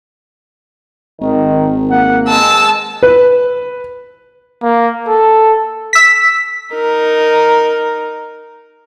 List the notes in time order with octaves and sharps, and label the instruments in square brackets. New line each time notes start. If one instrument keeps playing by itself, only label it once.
[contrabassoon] G#1 [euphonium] D#3
[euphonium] A#3 [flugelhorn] F#5
[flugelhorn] G#3 [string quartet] A5 E6
[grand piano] B4
[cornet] A#3
A4
[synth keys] E6 B6
[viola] D#4 A#4